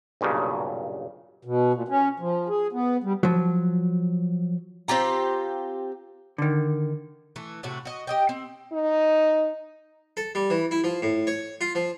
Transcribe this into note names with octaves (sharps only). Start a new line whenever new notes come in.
B1 G2 A#2 C#3
B2
A#2
C#4
F3
G#4
B3
G3
F3 F#3
C4 F4 G4 A#5
D3 D#3
E3 A3
A2 C3 A3 F#4
F#4 D#5
G4 D#5 G5
C4
D#4
A4
G3
E3
E4
F3
A2
C#5
F4
F3